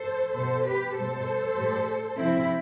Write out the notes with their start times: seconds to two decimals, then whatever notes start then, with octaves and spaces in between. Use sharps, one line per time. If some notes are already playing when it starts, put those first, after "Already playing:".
Already playing: A4 C5
0.33 B2 G3 A4 C5
0.65 G4 B4
0.94 B2 G3 A4 C5
1.55 A2 G3
2.17 C3 F3 C4 E4